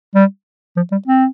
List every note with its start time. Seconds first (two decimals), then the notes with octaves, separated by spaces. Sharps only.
0.15 G3
0.76 F3
0.92 G3
1.07 C4